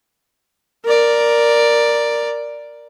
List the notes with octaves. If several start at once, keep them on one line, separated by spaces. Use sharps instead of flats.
A#4 D5